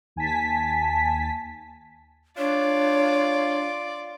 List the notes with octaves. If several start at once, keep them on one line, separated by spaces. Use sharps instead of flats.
D#2 G#5 A5 B6
D4 F4 C#5 D5